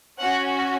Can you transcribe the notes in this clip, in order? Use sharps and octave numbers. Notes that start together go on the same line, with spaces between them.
C#4 F#4 F#5